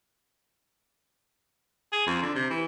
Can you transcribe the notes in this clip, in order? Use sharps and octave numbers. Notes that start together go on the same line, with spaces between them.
G#4
F2
D3
C3
E3